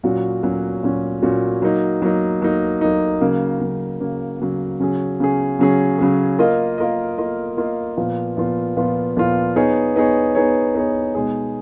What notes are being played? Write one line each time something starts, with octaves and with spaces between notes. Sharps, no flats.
A#2 F#3 C#4 F#4
A#2 F#3 C#4 F#4
A#2 F#3 C#4 F#4
A#2 F#3 C#4 F#4
F#3 A#3 D#4
F#3 A#3 D#4
F#3 A#3 D#4
F#3 A#3 D#4
C#3 F#3 A#3
C#3 F#3 A#3
C#3 F#3 A#3
C#3 F#3 A#3
C#3 F#3 C#4 G#4
C#3 F#3 C#4 G#4
C#3 F#3 C#4 G#4
C#3 F#3 C#4 G#4
A#3 F4 A#4 D#5
A#3 F4 A#4 D#5
A#3 F4 A#4 D#5
A#3 F4 A#4 D#5
A#2 F3 B3 F4
A#2 F3 B3 F4
A#2 F3 B3 F4
A#2 F3 B3 F4
B3 D#4 G#4 C#5
B3 D#4 G#4 C#5
B3 D#4 G#4 C#5
B3 D#4 G#4 C#5
B2 G#3 D#4 G#4